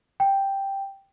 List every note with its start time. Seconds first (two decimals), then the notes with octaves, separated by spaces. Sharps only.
0.20 G5